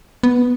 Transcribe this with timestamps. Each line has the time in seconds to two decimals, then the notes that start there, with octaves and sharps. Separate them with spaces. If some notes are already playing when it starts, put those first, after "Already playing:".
0.23 B3